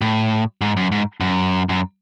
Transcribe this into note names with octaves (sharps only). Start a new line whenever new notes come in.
A2
G#2
F#2
G#2
F#2
F#2